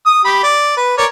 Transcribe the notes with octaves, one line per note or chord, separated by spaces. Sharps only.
D#6
G4 B5
D5
B4
A#4 C#5 D5